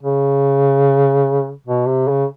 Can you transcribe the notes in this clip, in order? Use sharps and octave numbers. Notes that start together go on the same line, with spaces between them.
C#3
B2
C3
C#3